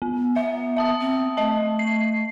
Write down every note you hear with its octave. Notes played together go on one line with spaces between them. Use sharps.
B3
B3 E5
E5 A5 D#6
C4
A3 D#5 A5
C7